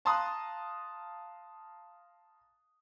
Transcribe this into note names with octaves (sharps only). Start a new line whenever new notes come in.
F5 A5 A#5 C6 D#6 F#6